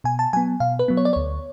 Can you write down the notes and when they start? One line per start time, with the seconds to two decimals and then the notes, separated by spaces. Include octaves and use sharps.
0.04 B2 G#5
0.19 A5
0.33 F#3 B3 G#5
0.60 B2 F5
0.79 B4
0.88 F#3 B3
0.97 C#5
1.05 D5
1.13 D2 C#5